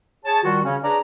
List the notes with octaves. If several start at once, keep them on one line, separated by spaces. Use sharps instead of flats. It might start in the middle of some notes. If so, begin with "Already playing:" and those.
G#4 C#5 A5
D#3 G3 F4 F#4
C#3 C#4
D4 G#4 B4 C#5 D5 A#5